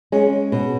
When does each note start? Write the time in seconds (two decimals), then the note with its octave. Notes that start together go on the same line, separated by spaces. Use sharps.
0.12 G#3 C#4
0.52 B2